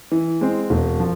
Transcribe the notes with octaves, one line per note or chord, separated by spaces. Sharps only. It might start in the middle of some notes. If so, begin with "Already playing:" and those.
E3
G#3 C4
E1
F3